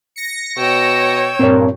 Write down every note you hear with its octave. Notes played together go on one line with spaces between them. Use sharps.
A#6 C#7
B2 C#5 G5 E6
G2 A#2 C4 A#4 C#5